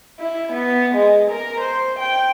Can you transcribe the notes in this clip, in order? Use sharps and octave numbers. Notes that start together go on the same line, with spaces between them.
E4
B3
G#3
A#4
C5
G5